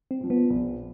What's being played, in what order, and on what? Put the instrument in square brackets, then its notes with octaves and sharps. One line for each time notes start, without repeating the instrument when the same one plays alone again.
[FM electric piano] C4
[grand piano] A#2 F3
[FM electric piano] B3
[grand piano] A#1